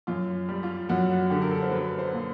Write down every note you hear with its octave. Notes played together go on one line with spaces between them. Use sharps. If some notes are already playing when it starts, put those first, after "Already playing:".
F#2 F4
G3
F4
F#2 F#4
F#4
D3 G4
A#4
A4
C5
F#3 B4
C5
A#2